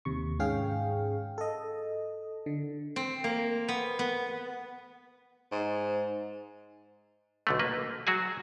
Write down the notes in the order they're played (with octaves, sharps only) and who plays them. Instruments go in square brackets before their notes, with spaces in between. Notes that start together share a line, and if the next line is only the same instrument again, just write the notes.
[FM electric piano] D#2 C3 C#6
G#2 C#4 G#4 F5 G5
A4 D#5
D3
[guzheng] C4
A#3
B3
B3
[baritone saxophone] G#2
[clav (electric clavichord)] B1 D3 A3
A#3 B4
F#3 F#4 G#4 G#5